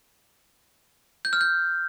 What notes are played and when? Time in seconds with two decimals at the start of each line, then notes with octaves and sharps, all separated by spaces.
1.25 G6
1.33 F6
1.41 G6